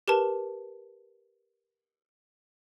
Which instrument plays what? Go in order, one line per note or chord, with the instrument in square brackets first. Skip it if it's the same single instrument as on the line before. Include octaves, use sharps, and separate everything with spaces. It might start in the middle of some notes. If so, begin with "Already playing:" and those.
[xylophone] G4 A#4 B4 A5